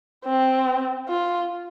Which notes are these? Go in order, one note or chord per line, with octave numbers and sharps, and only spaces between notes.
C4
F4